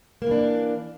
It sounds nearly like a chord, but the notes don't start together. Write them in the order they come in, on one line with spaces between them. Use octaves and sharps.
A#3 E3 D4